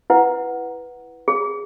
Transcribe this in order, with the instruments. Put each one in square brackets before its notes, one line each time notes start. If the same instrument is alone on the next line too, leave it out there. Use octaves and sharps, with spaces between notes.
[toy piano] E4 B4 F#5
G#4